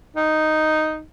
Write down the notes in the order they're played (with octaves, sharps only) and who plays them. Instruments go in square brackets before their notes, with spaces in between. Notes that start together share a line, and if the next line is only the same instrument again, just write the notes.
[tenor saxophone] D#4